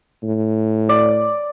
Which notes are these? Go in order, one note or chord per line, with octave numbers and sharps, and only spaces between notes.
A2
D5